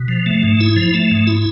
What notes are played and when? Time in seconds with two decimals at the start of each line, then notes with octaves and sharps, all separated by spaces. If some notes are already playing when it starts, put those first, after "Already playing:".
Already playing: B2
0.08 F3
0.26 A3
0.43 G#2
0.60 E4
0.76 F3
0.94 A3
1.11 G#2
1.27 E4